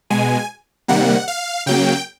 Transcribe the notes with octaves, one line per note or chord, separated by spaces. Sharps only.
B2 G#3 G#5
C3 D#3 G3 A#3 F#5
F5
C#3 F#3 A#3 G5